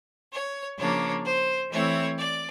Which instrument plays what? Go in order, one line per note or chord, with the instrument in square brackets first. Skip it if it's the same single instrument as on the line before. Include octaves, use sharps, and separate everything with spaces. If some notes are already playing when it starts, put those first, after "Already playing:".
[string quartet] C#5
C#3 F3 A#3 D4 C#5
C5
E3 A3 C4 E4 C#5
D5